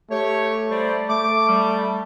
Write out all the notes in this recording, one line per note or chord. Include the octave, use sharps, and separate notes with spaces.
A3 G4 C#5
G3 C5 D5
A3 D6
G3